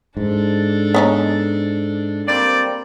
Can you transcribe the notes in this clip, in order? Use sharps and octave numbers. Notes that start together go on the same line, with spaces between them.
G#2 D4 A4
B3 C#4 D#4
G3 A#3 C4 D5